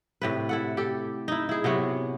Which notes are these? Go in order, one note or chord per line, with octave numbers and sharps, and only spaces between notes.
A2 C3 B4
E4 A4 F#5
G4 A4
D#4 E4
E4 G#4
C3 F#3 B3 F#4